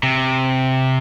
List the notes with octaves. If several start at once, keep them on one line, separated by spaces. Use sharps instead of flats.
C3